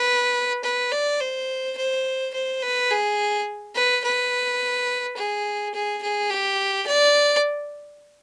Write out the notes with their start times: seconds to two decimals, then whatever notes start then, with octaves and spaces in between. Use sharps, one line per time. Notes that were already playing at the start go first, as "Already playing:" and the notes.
Already playing: B4
0.64 B4
0.92 D5
1.21 C5
1.77 C5
2.34 C5
2.63 B4
2.91 G#4
3.75 B4
4.04 B4
5.17 G#4
5.74 G#4
6.02 G#4
6.31 G4
6.87 D5